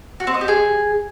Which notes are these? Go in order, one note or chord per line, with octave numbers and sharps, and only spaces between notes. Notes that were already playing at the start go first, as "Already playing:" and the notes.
F#4
C4
D#5
G4
G#4